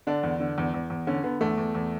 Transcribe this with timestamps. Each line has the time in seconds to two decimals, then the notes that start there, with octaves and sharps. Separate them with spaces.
0.07 D3 D4
0.23 E2
0.40 D3
0.58 E2
0.74 E2
0.90 E2
1.07 D3 C#4
1.24 D3 B3
1.41 E2 A3
1.58 E2
1.75 E2